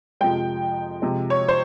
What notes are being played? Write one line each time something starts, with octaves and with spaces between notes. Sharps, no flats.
F2 C3 F3 G#3 G5
C3 F3 G#3
C#5
C5